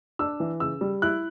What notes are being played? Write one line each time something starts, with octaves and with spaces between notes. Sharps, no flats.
D4 E6
E3
C#3 E6
G3
E4 F#6